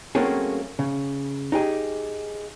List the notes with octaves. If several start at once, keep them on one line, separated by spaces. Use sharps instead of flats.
F#3 A3 A#3 C4 C#4 G#4
C#3
D#4 G4 G#4